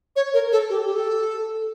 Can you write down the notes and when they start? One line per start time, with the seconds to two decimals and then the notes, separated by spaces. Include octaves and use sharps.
0.16 C#5
0.34 A#4
0.52 A4
0.70 G4
0.86 G4
0.96 A4